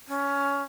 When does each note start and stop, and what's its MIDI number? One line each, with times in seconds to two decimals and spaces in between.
0.08 0.63 61